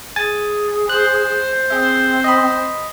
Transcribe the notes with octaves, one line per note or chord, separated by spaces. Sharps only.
G#4 G#5 A6
C5 F#6
C4 G#4 E5
D#5 B5